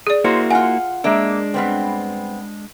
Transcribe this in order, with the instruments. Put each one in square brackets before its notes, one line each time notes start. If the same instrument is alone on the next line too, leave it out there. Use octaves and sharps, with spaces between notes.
[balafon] G#4 D5
[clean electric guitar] A#3 E4 F#4 [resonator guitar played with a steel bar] C5
[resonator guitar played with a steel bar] F4 F#5 [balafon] G#5
[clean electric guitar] G#3 D4 [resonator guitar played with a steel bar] A#3 E5
[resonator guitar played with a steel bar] G2 B3 C4